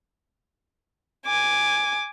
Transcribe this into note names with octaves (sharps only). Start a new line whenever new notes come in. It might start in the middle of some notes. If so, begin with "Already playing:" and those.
G#5 D6